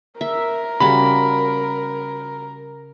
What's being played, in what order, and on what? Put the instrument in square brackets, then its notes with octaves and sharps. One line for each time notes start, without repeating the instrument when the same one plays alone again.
[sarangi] A#4 [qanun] E5
[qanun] C#3 G3 F#4 [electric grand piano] B5